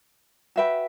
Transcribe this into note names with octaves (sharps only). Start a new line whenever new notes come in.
F#4 B4 E5 G5